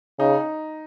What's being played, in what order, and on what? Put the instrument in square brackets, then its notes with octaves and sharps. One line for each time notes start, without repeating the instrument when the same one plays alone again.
[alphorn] C#3 [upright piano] D#4